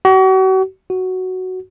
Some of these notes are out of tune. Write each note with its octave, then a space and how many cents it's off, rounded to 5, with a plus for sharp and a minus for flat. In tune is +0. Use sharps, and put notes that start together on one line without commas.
F#4 +40
F#4 +5